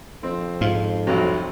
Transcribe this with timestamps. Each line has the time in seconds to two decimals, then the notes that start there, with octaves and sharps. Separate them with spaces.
0.23 F2 C4
0.61 G#2 F4
1.07 F1 C2 C3 F#3